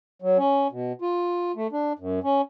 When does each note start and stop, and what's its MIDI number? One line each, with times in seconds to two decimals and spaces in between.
0.22 0.38 54
0.38 0.68 61
0.72 0.93 47
1.01 1.52 65
1.56 1.67 57
1.72 1.93 62
1.99 2.20 42
2.24 2.41 61